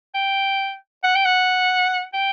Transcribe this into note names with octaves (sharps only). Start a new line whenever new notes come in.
G5
F#5
G5
F#5
G5